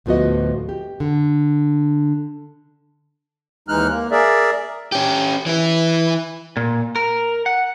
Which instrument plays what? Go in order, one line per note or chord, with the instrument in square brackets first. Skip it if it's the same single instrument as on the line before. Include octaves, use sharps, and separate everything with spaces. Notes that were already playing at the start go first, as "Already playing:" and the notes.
[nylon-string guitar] D2 A2 F3 B3 F#4 D#5
G4
D3
[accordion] D#2 E3 G#3 D#4 F6 F#6
A#3
G#4 A#4 D5 E5
[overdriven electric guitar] C#4 G4
E3 E4
[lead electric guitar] A#2
A#4
F#5